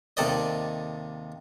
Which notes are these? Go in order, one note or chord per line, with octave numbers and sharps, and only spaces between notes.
D#2 C3 A4 D5 D#5